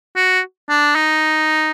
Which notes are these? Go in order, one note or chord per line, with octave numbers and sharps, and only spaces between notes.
F#4
D4
D#4